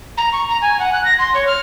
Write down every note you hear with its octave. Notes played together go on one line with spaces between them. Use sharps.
A#5
C#6
A#5
G#5
F#5
F#6
A#6
C6
C#5
F6